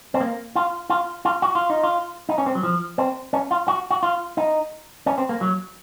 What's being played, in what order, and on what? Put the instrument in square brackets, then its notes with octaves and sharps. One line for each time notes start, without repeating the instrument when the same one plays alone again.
[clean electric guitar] C4
A#3
F4
F4
F4
F#4
F4
D#4
F4
D#4
C#4
C4
F#3
F3
C4
C#4
F4
F#4
F#4
F4
D#4
C#4
C4
A#3
F#3